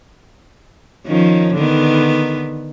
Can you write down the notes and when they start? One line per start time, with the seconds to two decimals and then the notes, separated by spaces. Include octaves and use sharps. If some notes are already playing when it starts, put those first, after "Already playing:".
1.07 D#3 F3 C#4
1.55 D3 D#3 B3